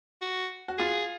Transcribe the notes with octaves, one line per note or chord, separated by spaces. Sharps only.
F#4
F#4
F4 G#4